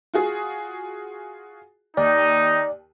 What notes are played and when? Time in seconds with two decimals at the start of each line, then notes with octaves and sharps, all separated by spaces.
0.14 F4 F#4 G#4
1.97 D#2 D#4 D5